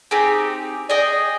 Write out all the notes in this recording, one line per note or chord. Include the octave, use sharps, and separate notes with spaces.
C4 D#4 G4 G#4
G#4 D5 D#5 G5